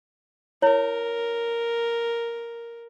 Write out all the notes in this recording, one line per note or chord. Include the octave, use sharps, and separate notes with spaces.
E4 A#4 C#5